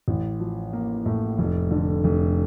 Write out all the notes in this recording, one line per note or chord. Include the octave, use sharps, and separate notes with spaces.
A1
F3
A#3
A2
F1
D3
F1